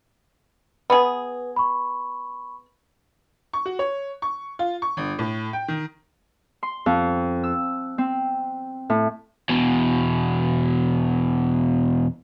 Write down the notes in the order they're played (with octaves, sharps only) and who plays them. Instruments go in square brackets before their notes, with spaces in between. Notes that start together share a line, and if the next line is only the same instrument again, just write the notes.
[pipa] B3 G#4 [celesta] B4
[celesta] B5 C#6
[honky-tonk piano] C#6
F#4
C#5
C#6
F4
C#6
G1
A2
G5
D#3
[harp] C6
F2
E6
C4
A2
[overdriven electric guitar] E2 B2